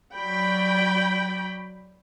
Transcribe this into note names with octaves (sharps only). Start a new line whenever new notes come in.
F#3 D5 G5 B5